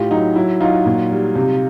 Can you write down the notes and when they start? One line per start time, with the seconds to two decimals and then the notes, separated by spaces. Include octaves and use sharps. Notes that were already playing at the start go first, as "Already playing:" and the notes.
Already playing: A2 F4 G4
0.10 F#3 D#4
0.36 F#3 E4
0.61 F#3 D#4 F4
0.86 A#2
1.11 G3
1.36 C3